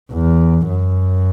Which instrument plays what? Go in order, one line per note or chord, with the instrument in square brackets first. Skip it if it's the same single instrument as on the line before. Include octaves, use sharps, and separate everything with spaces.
[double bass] E2
F#2